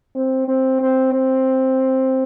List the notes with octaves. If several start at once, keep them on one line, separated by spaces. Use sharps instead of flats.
C4
C4
C4
C4